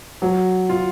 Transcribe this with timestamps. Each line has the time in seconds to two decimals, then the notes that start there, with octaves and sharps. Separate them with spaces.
0.22 F#3
0.69 F4